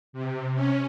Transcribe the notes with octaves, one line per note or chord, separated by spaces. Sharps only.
C3
C#4